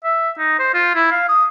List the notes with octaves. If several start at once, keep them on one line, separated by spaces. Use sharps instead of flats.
E5
D#4
C5
F4
E4
F5
D#6